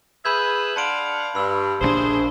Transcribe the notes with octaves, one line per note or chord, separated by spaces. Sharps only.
G#4 B4 E5 B5 G6 G#6
D4 F5 F#5 A5 C6 D7
G2 B5 E6
A#1 D3 D4 G#4 C5